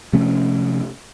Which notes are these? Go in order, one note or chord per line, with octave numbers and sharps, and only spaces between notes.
C3 F3 A3 C#4